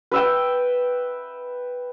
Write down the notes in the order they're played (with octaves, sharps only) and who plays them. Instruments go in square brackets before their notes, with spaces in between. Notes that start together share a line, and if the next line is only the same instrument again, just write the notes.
[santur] B4 E5 G5